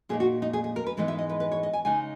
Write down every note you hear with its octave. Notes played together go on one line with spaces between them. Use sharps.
A#2 A#3 D#4 G#4
F#4
D#4
G#4
G#4
A#4
B4
G#2 E3 G#3 B3 D#4
E5
D#5
B4
B4
C#5
D#5
G#5
C#3 G#3 D#4 G#5